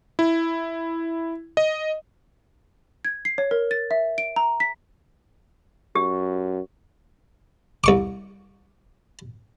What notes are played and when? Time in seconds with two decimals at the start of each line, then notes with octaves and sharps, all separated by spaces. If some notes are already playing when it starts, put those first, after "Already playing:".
0.19 E4
1.57 D#5
3.05 G#6
3.25 C7
3.38 C#5
3.51 A#4
3.71 A6
3.91 E5
4.18 D7
4.36 A#5
4.60 B6
5.95 F#2 G4
7.84 C2 C#6 D6